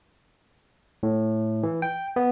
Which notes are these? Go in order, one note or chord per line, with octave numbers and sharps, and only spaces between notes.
A2
E3
G5
B3